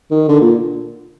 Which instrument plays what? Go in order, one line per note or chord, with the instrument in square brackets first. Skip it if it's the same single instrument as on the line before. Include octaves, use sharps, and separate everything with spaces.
[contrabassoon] D#3
D3
A#2